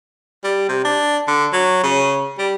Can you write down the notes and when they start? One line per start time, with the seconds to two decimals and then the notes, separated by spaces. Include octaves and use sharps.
0.44 G3
0.69 C3
0.84 D4
1.27 D3
1.52 F#3
1.83 C#3
2.38 G3